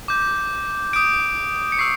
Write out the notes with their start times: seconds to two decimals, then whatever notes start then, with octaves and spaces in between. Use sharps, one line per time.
0.08 D6 G6
0.93 D#6 G6 D7
1.72 C#7
1.79 C#6 E6 G6 C7